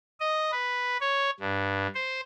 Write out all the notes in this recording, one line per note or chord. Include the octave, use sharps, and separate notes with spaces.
D#5
B4
C#5
G2
C5